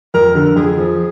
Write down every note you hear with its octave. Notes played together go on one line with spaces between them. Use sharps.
F2 A#4
D3 A#4
F2 G#4
F3